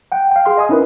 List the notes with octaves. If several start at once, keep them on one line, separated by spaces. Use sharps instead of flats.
F#5 G5
F5 G5
G#4 F5 C6
D#5 G#5 D#6
C#4 D#4 E4 A#4 B4